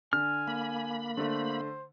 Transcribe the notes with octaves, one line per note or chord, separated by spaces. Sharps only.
D3 G#5 F6
A#3 B5
D3 A3 C5